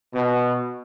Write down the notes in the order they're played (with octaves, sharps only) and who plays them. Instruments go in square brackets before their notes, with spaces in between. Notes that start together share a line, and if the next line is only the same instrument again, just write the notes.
[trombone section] B2